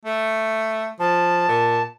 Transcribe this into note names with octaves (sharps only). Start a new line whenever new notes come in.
A3
F3 A5
A#2